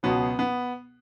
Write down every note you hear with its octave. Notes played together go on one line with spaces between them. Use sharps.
C#2 B2 F#3 B3
B3